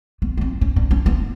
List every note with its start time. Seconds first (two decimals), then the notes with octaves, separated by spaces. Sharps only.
0.22 B3
0.37 B3
0.41 C4
0.61 C#4
0.76 D4
0.91 C#4
1.06 B3